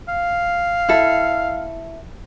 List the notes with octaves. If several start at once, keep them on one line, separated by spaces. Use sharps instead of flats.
F5
E4 A4